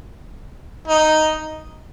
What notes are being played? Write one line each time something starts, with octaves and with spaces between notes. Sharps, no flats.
D#4